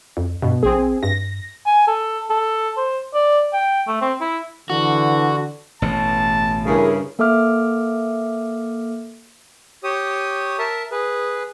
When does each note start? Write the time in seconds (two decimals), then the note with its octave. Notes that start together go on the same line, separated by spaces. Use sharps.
0.17 F2
0.42 G2 B2
0.63 A#1 C4 G#4
1.03 G2 A#6
1.66 G#5
1.87 A4
2.30 A4
2.77 C5
3.14 D5
3.54 G5
3.87 A3
4.01 C4
4.21 E4
4.70 D3 E3 F#4
5.82 A1 B2 A5
6.66 G2 C#3 E4 G#4 A#4
7.19 A#3 A4 E5 D6 F6
9.84 G4 C#5 D#6
10.59 A#4 E5 A5
10.92 G#4 B4